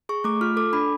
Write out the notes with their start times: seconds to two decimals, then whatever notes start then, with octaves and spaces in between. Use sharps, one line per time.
0.09 G#4 C#6
0.24 A3 D6
0.41 F4 F6
0.57 A4 D6
0.73 D4 B5